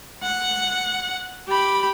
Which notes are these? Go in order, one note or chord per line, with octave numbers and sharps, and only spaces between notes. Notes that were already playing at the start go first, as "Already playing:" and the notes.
F#5
G4 B5